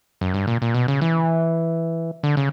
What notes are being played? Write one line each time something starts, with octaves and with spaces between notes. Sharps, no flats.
F#2
G2
A#2
A#2
B2
C#3
E3
D3
C#3